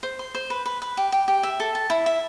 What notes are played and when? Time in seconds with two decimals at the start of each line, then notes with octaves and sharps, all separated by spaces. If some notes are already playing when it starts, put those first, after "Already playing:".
0.03 C5
0.19 C6
0.35 C5
0.50 B4
0.66 B4
0.82 B4
0.97 G4
1.12 G4
1.28 G4
1.43 E5
1.60 A4
1.75 A5
1.90 E4
2.06 E5